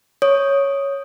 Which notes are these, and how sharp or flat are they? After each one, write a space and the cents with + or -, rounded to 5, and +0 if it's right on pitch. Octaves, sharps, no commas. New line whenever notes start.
C#5 +0 D#6 +0